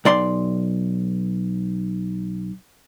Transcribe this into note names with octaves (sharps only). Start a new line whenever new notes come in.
B1 D5 C6